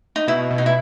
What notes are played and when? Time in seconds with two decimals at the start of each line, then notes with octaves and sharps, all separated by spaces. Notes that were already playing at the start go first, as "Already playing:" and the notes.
0.16 D#4
0.27 B2 E4
0.50 B2
0.58 D#4
0.66 E4